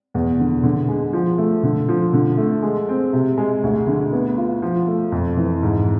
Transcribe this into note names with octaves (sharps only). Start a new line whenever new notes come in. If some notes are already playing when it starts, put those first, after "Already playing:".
E2
D3
D3
G#3
F3
A3
D3
F3
D3
A3
G#3
C4
C3
G#3
D2
D3
B3
F4
F3
A3
F2
E3
G#2